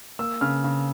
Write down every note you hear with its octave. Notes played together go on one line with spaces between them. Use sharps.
A#3 E6
C#3 F6
C#3